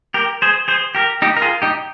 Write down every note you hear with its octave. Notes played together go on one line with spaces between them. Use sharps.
G4 A#4
G#4 C5
G#4 C5
G4 A#4
D#4 G4
A#4
F4 G#4
D#4 G4